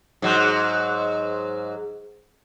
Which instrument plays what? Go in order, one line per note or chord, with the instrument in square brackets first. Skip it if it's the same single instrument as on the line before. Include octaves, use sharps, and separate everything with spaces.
[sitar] G#2 F#3